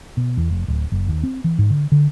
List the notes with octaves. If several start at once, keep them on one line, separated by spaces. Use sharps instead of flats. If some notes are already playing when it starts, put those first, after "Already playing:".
B2
E2
F1
D1
F#1
D#2
C4
E3
G#2
D3
D3